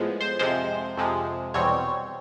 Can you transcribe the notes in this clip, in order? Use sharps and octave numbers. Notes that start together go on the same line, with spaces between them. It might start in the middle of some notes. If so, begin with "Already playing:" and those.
Already playing: A2 F3 G#3 B3
C5
F2 C3 F3 G#3 C5
F2 C3 F3 G#3
E2 B2 G3 C4 C#5